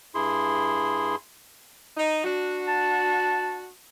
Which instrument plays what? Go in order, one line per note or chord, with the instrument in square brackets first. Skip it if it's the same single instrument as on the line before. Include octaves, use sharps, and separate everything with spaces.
[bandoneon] G2 E4 G#4 C6
[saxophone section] D#4
D4 F#4
[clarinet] A5